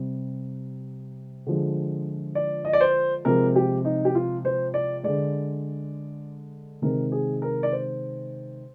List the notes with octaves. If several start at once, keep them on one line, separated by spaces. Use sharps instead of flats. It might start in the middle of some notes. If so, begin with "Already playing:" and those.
Already playing: C3 G3
D3 F3 G#3
D5
D#5
D5
C5
C3 F3 G#3 A#4
G4
D#4
G4
F4
C5
D5
D3 G#3 D5
C3 D#3 G#3 A#4
G#4
A#4
D5
C5